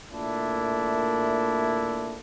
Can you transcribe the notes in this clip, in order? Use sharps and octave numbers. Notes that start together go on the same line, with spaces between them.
A#2 A3 A#3 D4 E4